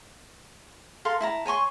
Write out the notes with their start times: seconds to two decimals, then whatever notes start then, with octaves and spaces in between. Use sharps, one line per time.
1.05 A4 A#4 F5 C6
1.20 E4 A5 A#5
1.46 C#5 G#5 C6 C#6